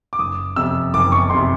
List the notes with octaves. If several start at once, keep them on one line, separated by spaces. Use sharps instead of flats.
D6
F#1 D#6
F2 C3 E6
F#1 D6
C#6
F2 C3 C6